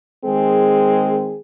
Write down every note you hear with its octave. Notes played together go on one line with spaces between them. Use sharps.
D#3 G#3 C4 G#4